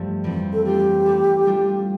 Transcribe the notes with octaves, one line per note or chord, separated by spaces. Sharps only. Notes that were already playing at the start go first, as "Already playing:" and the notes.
Already playing: G2 F3 A3 C4
F2 E3 G3 C4
A4
A3 D4 F4 G4 C5
A3 E4 A4
G3 D4 F4